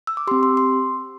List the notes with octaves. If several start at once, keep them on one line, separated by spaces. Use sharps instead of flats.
E6
D6
C4 G4 C6
C6
C6